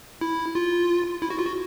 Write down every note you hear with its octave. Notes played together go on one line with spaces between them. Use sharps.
E4
F4
E4
F#4
F4
F#4